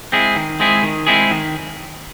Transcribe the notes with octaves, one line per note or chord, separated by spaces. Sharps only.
G#3 C4 E4 G#4
D#3
G#3 C4 E4 G#4
D#3
G#3 C4 E4 G#4
D#3